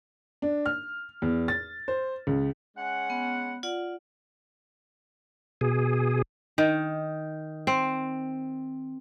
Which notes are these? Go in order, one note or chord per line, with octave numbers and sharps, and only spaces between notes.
D4
F6
E2
A6
C5
C#2
G#3 C#4 F#5
B3
F4 D5 F#5
B2 G#4
D#3
C4